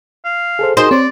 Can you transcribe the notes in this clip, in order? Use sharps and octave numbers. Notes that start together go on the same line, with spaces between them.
F5
G#4 A4 C5
D#4 F#4 G#4 A#4 C5 D#5
C4 C#5 D5 C6